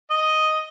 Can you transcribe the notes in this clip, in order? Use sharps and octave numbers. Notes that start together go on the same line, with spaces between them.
D#5